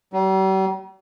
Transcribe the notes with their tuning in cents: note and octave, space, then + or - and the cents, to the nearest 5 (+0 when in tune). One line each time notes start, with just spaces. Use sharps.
G3 -45